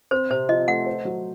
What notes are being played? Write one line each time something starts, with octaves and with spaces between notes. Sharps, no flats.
C4 C5
C3 C5
F3 D#5
A3 F#5
C5
F#3